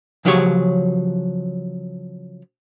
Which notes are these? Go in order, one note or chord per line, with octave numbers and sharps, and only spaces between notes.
C#3 F3 F#3 G4 G#4 C#5